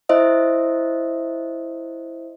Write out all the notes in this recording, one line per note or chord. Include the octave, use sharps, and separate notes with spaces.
E4 C5 D#5 E5